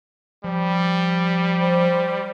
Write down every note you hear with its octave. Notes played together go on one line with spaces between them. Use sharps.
F3 G3
C5